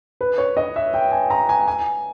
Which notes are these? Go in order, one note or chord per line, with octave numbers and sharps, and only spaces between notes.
B4
C#5
D#5
E5
G5
G#5
A#5
G#5
G#5